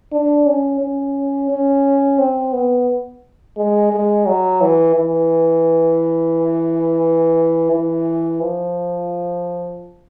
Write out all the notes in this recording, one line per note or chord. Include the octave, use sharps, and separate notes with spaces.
D4
C#4
C#4
C#4
C4
B3
G#3
G#3
F#3
E3
E3
E3
F3